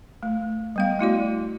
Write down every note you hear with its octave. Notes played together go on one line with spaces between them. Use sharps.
A3
G3 B3 F5
A3 E4 F#4 D5